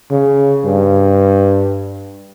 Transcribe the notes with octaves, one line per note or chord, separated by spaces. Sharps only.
C#3
G2